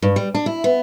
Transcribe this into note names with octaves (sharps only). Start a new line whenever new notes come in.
G2
G3
D4
E4
B3